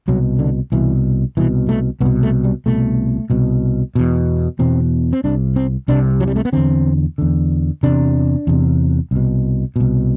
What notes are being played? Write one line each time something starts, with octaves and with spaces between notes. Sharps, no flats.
C2 B2 F#3
D3
C2 B2 E3
C2 B2 E3
A3
C2 B3
B2
A3
G3
C2 B2 A3
C2 B2
E2 B2
E2 B2 C4
C4
C2 C3 D4
C4
C2 C3 D4
F#3
G3
A3
B3
E2 D3 C4
E2 D3
E2 C3 D4
E2 C3
C2 B2
C2 B2